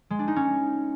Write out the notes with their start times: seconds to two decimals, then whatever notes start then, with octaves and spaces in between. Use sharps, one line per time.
0.10 G#3
0.19 D4
0.28 D#4
0.36 C#4